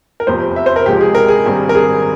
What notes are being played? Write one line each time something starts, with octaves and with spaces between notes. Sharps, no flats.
A#4
F1 E2 C3 F3 C5
E5
C5
A#4
C#2 C3 F3 G#3 G4
G#4
A#4
G#4
G#1 G2 G3 C4
A#4
G#4